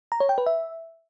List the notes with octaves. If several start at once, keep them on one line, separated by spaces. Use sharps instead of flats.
A#5
C#5
G5
B4
E5